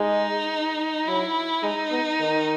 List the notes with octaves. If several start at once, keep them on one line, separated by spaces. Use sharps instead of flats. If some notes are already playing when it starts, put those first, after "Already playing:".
Already playing: G#3 D#4
F#3 E4
G#3 D#4
B3
D#3